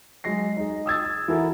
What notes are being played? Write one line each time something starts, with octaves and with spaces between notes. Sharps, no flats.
F#3 G#3 A#6 C7
D#4 G#4
D#6 E6 G#6 A6
E3 E4 F#4 A4 A#4